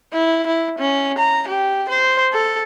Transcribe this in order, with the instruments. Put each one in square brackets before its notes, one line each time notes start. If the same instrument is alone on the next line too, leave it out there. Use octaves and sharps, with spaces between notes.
[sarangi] E4
E4
C#4
A#5
G4
C5
A4